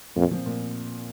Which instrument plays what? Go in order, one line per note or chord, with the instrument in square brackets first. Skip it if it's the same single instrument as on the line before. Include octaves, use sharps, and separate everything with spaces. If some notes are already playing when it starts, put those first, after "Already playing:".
[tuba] F2 [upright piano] A#2
[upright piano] F3 C4
A#2